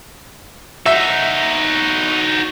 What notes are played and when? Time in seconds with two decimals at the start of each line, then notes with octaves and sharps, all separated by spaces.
0.86 D#4 F#4 E5